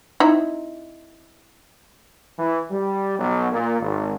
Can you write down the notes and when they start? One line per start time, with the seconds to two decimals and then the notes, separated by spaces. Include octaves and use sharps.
0.20 C4 D#4 E4
2.37 E3
2.72 G3
3.19 B1
3.52 A#2
3.81 G#1